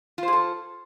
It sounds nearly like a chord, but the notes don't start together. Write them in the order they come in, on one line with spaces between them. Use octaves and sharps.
F4 C5 G#4 A4